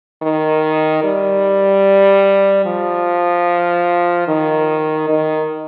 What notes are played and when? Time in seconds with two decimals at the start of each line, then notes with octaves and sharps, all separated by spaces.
0.22 D#3
1.04 G3
2.65 F3
4.28 D#3
5.09 D#3